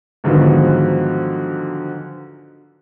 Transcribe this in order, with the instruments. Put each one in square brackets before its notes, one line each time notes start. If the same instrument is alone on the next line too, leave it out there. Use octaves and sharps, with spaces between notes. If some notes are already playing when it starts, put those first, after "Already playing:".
[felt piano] G#2 D3 D#3 F3 F#3 B3